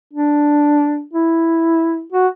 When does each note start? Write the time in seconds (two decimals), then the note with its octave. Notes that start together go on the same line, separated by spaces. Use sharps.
0.13 D4
1.14 E4
2.13 F#4